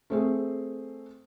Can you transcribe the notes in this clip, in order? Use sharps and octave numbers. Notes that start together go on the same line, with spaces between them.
A3 C4 G#4